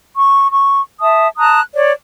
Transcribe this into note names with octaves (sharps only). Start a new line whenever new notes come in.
C#6
C#6
E5 A5 D#6
A5 A#5 D#6 F#6
C#5 D5